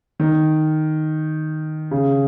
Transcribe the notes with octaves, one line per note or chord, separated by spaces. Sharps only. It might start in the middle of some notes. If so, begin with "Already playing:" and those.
D#3
C#3